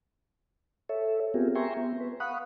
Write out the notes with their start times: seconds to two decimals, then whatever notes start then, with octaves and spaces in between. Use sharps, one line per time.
0.89 A4 C#5 E5
1.34 B3 C4 F4 G4 G#4 A#4
1.55 E5 G5 G#5 A#5 C6 C#6
1.77 B3
2.00 B4
2.20 F5 F#5 B5 C#6 D#6 F#6